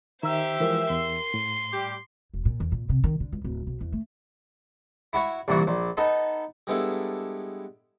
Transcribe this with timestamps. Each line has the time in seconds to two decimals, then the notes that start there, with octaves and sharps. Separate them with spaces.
0.23 D#3 G4 C5 E5 A#5
0.60 E3 F3 G#3 A#4
0.90 E2 C6
1.34 A2
1.72 G3 G4 D6
2.34 E1
2.45 A#2
2.60 E2
2.72 A#2
2.89 C3
3.04 D#3
3.20 D3
3.32 C#2
3.44 D1
3.67 B1
3.81 E2
3.92 A3
5.13 E4 F#4 C#5
5.48 C2 A#2 E3 F#4
5.67 A#1
5.97 B3 D#4 A4
6.67 G3 G#3 B3 D4 E4 A4